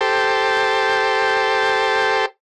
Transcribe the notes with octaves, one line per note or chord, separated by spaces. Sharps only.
G4 A4 C5